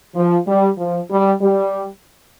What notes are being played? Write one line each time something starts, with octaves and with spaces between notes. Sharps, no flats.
F3
G3
F3
G3
G3